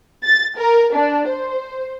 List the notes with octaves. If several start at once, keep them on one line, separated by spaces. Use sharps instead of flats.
A6
A#4
D4
C5